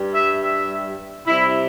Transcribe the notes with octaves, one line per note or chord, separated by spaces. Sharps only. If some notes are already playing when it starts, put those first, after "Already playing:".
Already playing: G2 G3
E5
E5
C3 G3 E4